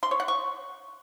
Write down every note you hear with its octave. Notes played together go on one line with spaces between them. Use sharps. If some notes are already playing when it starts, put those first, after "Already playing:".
C6
C#5
F#5
C#6